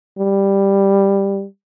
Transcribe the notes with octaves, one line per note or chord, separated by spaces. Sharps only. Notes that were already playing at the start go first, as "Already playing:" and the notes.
G3